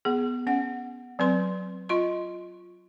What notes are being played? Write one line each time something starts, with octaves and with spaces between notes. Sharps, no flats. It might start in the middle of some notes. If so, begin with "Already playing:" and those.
B3 G#4
C#4 F#5
F#3 C4 B4 C6
F4 D#5 C6